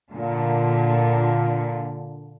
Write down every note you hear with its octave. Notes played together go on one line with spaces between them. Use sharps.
A#2 D3